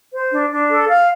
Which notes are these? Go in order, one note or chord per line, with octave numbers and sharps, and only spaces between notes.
C5
D4
D4
A4
F5